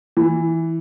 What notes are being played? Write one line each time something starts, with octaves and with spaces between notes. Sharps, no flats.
E3